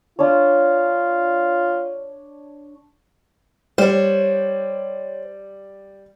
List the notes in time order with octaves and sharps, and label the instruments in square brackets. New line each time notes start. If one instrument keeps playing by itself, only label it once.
[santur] D4 C#5 [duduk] F4
[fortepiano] G3 [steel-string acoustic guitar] C5 C#5